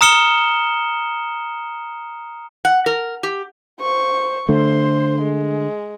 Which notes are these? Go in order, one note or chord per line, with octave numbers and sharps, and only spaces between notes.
A#5 D#6 F6 C#7 E7 G7
F#5
A#4
G4
C5 C#6
D3 A3 C5 C6
G#3